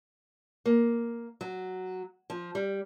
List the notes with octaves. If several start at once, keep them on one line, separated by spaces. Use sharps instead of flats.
A#3
F#3
F3
G3